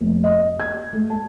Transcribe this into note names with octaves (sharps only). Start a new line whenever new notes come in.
F1
D#5
G#6
A3
A5